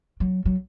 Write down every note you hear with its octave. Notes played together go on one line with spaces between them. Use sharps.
F#3
F#3